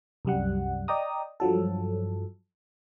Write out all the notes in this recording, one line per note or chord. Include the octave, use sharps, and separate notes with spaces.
C2 F#2 G3 F#5
D5 D#5 G5 A#5 D#6
G2 F3 F#3 A4